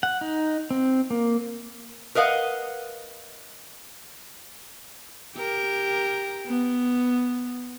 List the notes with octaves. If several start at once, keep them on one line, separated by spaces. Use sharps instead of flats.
F#5
D#4
C4
A#3
A#4 B4 D#5 F5 F#5
G4 A#4
B3